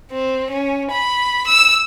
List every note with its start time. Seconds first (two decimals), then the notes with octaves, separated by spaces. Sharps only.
0.12 C4
0.50 C#4
0.91 B5
1.47 E6